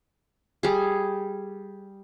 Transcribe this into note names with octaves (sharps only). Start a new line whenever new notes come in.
G3 G#4